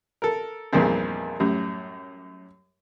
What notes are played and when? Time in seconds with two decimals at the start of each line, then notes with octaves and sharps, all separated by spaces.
0.22 A4 A#4
0.72 E2 G2 A#2 D#3 F3 C4
1.40 F#2 A2 G3